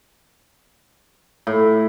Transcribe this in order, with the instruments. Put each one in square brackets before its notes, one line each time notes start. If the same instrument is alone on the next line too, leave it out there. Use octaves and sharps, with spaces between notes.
[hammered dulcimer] A2